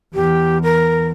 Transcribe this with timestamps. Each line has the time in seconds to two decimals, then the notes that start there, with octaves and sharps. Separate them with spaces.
0.14 E2 G4
0.63 A#4